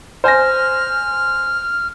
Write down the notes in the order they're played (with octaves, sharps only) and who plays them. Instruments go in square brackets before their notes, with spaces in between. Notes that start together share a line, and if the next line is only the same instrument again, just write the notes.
[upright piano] C5 G#5 A#6 [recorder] F6